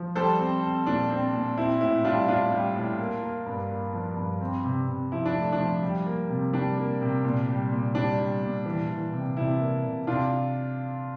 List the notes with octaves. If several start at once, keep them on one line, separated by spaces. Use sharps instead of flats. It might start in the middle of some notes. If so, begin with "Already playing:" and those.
Already playing: F3
G3 A4 C5
C4
C4
A#2 D4
C4
A#2
C4 E4
A2 E4
G3 D4 F4
A2 D4 F4
G3
A2
A#3
A#3
G2
A#3
F3
G2
C4
C3
C3
F3 E4
D4
A3
D4
F3
G3
A#3
C3
G3 D4
A#3
C3
A#2
G3
A#2
G3 D4
G3
A#2
E3
E3
C3
C3 E4
A#3
C3
C3 D4 F4